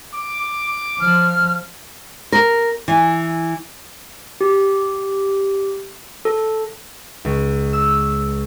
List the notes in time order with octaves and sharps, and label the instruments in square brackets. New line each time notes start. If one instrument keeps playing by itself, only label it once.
[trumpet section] D6
[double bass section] F3 [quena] F6
[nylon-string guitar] A#4
E3
[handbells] G4
A4
[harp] C#2
E6